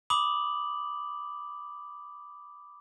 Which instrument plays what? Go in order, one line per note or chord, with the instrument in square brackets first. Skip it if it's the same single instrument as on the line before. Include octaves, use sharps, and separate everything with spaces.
[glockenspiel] B5 D6 D#6 F#7